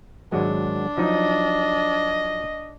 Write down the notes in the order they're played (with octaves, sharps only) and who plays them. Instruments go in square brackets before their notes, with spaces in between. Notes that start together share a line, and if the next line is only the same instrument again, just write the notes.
[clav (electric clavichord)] G#1 F#3 G#3 [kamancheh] D4
[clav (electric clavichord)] F3 F#3 D#4 [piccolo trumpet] D#5